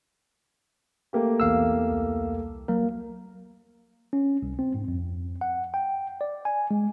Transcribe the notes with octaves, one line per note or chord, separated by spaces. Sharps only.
A3 A#3 G4
B1 E2 F5 E6
C2
F#3 A#3 A#4
C#4
C2
C4
G#2
F2
F#5
G5
D5
G#5
G#3